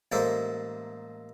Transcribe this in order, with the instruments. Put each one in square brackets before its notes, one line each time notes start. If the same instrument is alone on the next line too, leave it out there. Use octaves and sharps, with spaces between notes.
[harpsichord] A1 G#3 A#3 A4 C5 E5